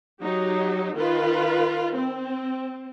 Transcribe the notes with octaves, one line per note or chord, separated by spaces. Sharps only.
F#3 D#4 G4
D#3 F4 A#4 B4
C4